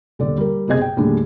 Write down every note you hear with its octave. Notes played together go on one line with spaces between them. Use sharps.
D#1 D3 D4 D5
G3 A#4
F#1 B1 C3 G#4 D#5 G#6
G5
D#2 A2 D3 G3 D4 G#4